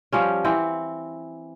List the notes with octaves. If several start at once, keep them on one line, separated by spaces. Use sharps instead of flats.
F3 G3 C#4
E3 C4 F#5